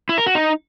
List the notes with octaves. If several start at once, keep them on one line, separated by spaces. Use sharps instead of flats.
E4
A#4
F#4
D#4